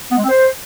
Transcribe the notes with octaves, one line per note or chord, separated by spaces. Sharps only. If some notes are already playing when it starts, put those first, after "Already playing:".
B3
G#3
C4
C5